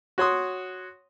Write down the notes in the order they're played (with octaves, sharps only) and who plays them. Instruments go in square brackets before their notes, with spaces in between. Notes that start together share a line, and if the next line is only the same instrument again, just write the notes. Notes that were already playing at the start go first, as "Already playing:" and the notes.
[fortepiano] F#4 C#5 C6 D#6